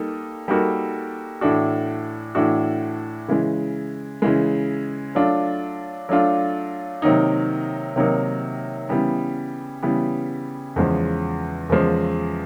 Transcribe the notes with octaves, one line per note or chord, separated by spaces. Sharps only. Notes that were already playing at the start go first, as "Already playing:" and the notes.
Already playing: G3 A#3 D#4 A4
G3 A#3 D#4 F#4 A4
A2 E3 A3 D4 F#4
A2 E3 A3 D4 F#4
C#3 E3 G#3
C#3 E3 G#3
F#3 A3 D4 F4
F#3 A3 D4 F4
C3 D#3 F#3 A#3 D#4
C3 D#3 F#3 A#3 D#4
C#3 E3 G3 B3
C#3 E3 G3 B3
E2 C#3 F3 G#3
E2 C#3 F3 G#3